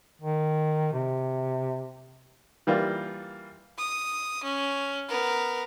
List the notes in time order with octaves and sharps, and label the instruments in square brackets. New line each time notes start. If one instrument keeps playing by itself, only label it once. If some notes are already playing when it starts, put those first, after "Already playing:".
[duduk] D#3
C3
[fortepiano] E3 G3 A#3 F4
[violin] D#6
C#4
B3 A#4